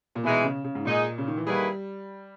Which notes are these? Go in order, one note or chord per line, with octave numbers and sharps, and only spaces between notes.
A#2
B2 E3 G#3 D#4
C#3
C#3
G#2
A#2 G#3 D#4 G#4
C#3
D#3
E3
D#3 G3 A#3 E4 G#4 B4